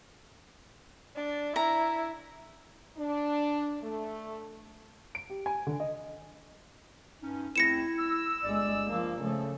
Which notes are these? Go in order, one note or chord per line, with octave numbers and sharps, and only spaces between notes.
D4
E4 A#5
D4
A3
D7
G4
G#5
D3
D#5
G2 C#4 D#4
E2 A3 C4 E4 A#6 C#7 E7
E6
G1 G#3 D5
F3 A#3
C#3 F3 A3